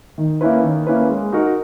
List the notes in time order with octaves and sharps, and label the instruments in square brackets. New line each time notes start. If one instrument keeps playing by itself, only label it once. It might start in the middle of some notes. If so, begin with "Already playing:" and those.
[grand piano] D#3
A#3 C#4 E4 B4
D#3
A#3 C#4 E4 B4
G#3
D#4 F#4 A#4